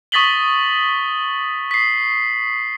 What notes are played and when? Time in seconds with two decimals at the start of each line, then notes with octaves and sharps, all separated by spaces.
0.12 C#6 D#6 A6 B6 F#7 G7
1.71 B6 C7